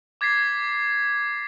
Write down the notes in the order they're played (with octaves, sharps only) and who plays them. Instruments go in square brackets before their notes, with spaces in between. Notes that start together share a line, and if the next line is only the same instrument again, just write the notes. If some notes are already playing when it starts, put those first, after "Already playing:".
[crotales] D6 G#6 A6 B6 C7